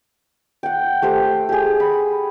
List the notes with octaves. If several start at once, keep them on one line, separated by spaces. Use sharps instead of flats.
F#5 G5
A3 G4 C5
G4 G#4
B5